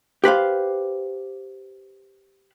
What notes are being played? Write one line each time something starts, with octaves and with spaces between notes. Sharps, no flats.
G4 B4 C5 F5